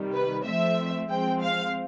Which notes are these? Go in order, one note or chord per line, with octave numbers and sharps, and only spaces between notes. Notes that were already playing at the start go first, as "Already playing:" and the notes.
Already playing: C3 D#3 G3
B4
F3 A3 C4 E5
F3 G#3 C4 G5
F5